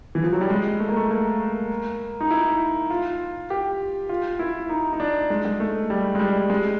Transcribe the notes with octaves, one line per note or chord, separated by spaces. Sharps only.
E3
F3
F#3
G3
G#3
A3
A#3
A3
A#3
D#4
E4
F4
G4
F4
E4
D#4
D#4
D4
G#3
G#3
A3
G3
G#3
G3
G#3